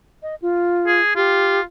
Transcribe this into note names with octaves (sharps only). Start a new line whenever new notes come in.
D#5
F4
G#4
F4 G4